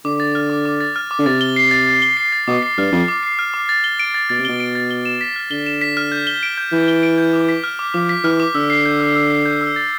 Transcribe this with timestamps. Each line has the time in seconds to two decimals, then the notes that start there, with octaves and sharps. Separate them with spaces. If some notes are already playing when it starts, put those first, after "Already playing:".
0.05 D3 D6
0.20 A6
0.35 F6
0.50 D6
0.65 D6
0.80 A6
0.96 F6
1.11 D6
1.19 D3
1.26 C3 A6
1.41 G7
1.56 C7
1.71 A6
1.87 A6
2.02 G7
2.17 C7
2.32 A6
2.48 B2 D6
2.63 C7
2.78 G2 F6
2.92 F2 D6
3.08 D6
3.23 C7
3.39 F6
3.54 D6
3.69 A6
3.84 G7
3.99 D7
4.14 A6
4.29 B2 A6
4.39 C3
4.45 B2 G7
4.60 D7
4.75 A6
4.91 G7
5.05 E7
5.21 B6
5.36 F6
5.51 D3 G7
5.66 E7
5.81 B6
5.97 F6
6.12 G6
6.27 G7
6.43 D7
6.58 G6
6.72 E3 G6
6.88 G7
7.03 D7
7.18 G6
7.33 D6
7.49 B6
7.64 F6
7.79 D6
7.94 F3 D6
8.09 B6
8.24 E3 F6
8.40 D6
8.55 D3 E6
8.70 C7
8.85 G6
9.00 E6
9.16 E6
9.30 C7
9.46 G6
9.61 E6
9.76 A6